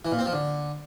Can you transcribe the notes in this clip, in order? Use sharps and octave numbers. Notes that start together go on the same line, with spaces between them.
E3
A#2
C4
F3
D3